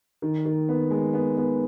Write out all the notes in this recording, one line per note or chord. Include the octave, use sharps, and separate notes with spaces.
D#3
D#3
B3
G#3
B3
B3